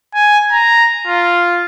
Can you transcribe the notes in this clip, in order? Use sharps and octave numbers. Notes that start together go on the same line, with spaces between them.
G#5
A#5
F4